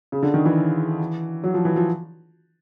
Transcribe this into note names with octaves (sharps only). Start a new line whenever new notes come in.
C#3
D3
D#3
E3
F#3
F3
E3
F3